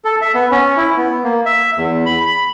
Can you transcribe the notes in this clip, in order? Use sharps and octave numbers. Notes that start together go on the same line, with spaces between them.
A4
E5
B3
C#4
E4
B3
A#3
E5
E2
B5
B5